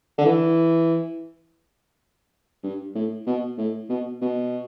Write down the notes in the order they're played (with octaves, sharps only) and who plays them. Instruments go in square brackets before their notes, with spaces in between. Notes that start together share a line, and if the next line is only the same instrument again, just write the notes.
[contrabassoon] D3
E3
G2
A2
B2
A2
B2
B2